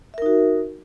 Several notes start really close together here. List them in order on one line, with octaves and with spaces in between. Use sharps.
E5 A#4 D#4 F#4